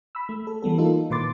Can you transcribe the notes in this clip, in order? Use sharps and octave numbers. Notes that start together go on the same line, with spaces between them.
B5 E6
A3
A4
E3 G3 B3 A4
A#3 D#4 F4 A4
A#2 D#3 B4 C6 D6 A6